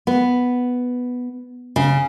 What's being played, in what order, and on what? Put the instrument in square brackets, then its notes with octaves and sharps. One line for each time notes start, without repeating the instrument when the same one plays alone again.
[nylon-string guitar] B3
C#3